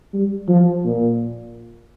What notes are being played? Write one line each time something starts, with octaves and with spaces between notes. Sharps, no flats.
G3
F3
A#2